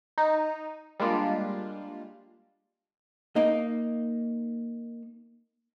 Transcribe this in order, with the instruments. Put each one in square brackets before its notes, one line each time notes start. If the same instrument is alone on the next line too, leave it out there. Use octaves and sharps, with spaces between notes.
[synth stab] D#4
G3 G#3 A#3 D4 F4
[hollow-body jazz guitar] A#3 D#4 D#5